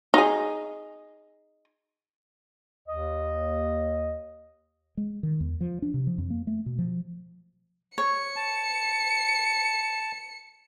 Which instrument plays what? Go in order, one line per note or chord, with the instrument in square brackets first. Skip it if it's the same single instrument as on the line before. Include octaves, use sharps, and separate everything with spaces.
[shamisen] D#4 G#4
[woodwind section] D#2 D#5
[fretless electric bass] G#3
D#3
E2
F3
D4
C3
F3
F2
A#3
A3
B2
F3
[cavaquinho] C#5 [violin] C#7
[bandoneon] A5